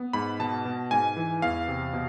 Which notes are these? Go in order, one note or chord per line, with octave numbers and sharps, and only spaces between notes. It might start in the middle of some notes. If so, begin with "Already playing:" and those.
Already playing: B3
G#2 B5
B2 A5
B2
G#2 G#5
E3
E2 F5
C3
B2